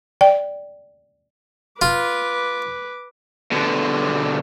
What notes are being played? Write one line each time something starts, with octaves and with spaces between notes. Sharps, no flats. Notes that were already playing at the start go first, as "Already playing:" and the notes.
D5 G5
F4 B4 D6
B2 D3